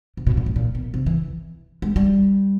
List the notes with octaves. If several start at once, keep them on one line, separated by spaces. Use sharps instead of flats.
C3
B2
A#2
A2
A#2
B2
C3
E3
G#3
G3